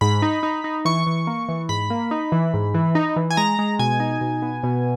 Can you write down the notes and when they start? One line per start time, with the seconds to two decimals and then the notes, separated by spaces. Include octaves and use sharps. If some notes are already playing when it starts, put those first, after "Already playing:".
0.01 G#2 B5
0.22 D#4
0.43 D#4
0.64 D#4
0.85 E3 C#6
1.07 E3
1.27 A#3
1.49 E3
1.69 G#2 B5
1.90 A#3
2.11 D#4
2.32 E3
2.54 G#2
2.74 E3
2.95 D#4
3.16 E3
3.31 G#5
3.37 G#3 A#5
3.59 G#3
3.79 B2 G#5
4.00 D#4
4.21 B2
4.42 B3
4.63 B2